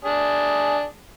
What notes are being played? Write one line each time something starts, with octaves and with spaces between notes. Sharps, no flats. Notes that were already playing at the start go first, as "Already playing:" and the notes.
D4 G#4 D#6